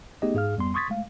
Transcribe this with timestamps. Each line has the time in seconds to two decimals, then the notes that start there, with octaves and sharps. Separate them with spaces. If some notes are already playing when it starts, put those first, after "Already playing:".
0.22 A3 B3 D#4 G4 G#4 D#5
0.34 G#2 G#4 F5 F6
0.57 F2 G3 B3 C6
0.74 C6 C#6 D#6 G#6 A6 B6
0.90 G#3 A3 F5